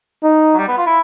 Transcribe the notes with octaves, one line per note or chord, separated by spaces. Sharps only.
D#4
F#3
G3
B3
F4
E4